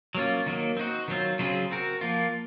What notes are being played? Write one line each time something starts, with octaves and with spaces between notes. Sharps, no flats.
F#3 A#3 C#4 F4
D#3 F#3 A#3
C4 D#4 F#4
D#3 F#3 C4 F4
C#3 F#3 C4 F4 G#4
C4 F#4 A#4
F3 A#3 F4